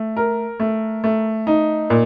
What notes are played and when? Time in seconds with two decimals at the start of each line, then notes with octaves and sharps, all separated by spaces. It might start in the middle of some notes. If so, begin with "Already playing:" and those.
Already playing: A3
0.17 A#4
0.60 A3
1.04 A3
1.47 D#4
1.90 A#2